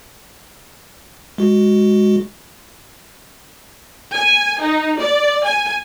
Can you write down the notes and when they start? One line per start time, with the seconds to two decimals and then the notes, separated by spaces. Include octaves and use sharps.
1.38 G#3 F#4
4.14 G#5
4.60 D#4
5.00 D5
5.44 G#5